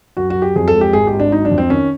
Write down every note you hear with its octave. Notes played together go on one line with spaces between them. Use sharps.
F#2 F#4
F#4
F#3
G4
F2 G#4
A4
G#3
G4
G#1 G#4
G4
G#1
D4
F#3 D#4
D4
F2
C4
D#3 C#4